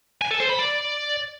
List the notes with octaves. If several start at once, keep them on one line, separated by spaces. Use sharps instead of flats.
G#5
A4
C5
B5
D5